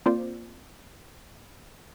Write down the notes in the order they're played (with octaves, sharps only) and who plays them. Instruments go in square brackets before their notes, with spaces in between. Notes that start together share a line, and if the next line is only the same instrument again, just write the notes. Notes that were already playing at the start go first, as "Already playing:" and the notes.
[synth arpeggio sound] A#3 C4 F4 C5 D5